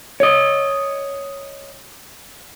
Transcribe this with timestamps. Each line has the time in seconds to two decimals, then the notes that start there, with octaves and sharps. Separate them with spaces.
0.20 C#5 D#5